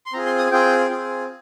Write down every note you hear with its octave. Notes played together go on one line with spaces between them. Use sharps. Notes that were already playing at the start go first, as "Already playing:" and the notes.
C6
C4 F4 G#4 A#5
C6
D#6
C4 F4 G#4 G5
C4 F4 G#4